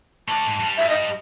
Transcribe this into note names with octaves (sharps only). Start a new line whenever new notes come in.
A3 D5 A5
G#2
G2 G3
E5
D#5